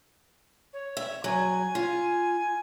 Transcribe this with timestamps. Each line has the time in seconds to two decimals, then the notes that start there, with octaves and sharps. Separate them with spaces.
0.73 C#5
0.97 E5
1.24 F#3 G#5
1.75 F4